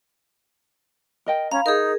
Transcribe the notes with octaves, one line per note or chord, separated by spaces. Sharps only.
A#4 D#5 G5
C#4 F5 A#5 B5
D#4 G#4 A#4